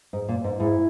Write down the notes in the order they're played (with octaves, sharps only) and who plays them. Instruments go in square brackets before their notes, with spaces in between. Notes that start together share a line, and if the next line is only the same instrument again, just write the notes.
[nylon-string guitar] G#2
A#2
G#2
[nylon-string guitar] G#2 [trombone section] E4